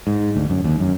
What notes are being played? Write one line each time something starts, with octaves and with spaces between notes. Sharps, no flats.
G#2
D2
F#2
D#2
F#2